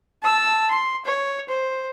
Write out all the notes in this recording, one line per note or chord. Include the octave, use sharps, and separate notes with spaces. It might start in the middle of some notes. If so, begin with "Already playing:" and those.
A5 E6
C6
C#5
C5